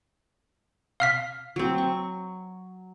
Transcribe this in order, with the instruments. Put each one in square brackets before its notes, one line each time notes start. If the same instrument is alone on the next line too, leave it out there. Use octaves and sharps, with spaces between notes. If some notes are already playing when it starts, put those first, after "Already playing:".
[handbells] F5 F6 B6
[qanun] F#3 C4
C#6